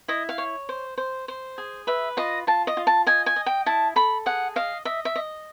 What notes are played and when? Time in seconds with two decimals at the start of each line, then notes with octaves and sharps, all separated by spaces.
0.08 E4 D#5
0.29 F5
0.38 C#5
0.69 C5
0.98 C5
1.28 C5
1.58 G#4
1.87 B4 E5
2.17 F4 D#5
2.47 F4 A5
2.67 D#5
2.77 F4
2.87 A5
3.06 D#5 G#5
3.26 G#5
3.36 D#5
3.46 G5
3.66 E4 A5
3.96 A4 B5
4.26 G#4 F#5
4.56 D#5 F5
4.85 D#5 E5
5.05 E5
5.16 D#5